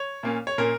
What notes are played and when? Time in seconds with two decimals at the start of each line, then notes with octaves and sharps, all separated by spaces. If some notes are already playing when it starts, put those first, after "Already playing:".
Already playing: C#5
0.23 A#2 A#3 C#4
0.47 C#5
0.58 A#2 A#3 C#4 A#4